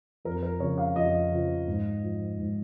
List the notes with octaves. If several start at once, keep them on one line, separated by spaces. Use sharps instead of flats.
F2 A#4
A#4
C#3 F3 C#5
F5
F2 D#5
C#3 F3
G#2
F3
G#2